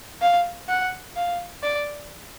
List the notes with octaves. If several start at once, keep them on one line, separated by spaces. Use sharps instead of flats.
F5
F#5
F5
D5